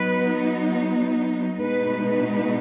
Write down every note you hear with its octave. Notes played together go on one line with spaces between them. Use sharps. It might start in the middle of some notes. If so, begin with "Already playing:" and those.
Already playing: F#3 B3 D#4 B4
B2 G#3 B3 D#4 B4
B4